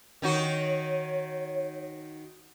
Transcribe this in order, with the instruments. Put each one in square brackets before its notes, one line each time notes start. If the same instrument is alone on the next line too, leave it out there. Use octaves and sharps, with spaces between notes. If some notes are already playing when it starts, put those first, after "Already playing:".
[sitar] D#3 D#4 F#4 [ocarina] C#5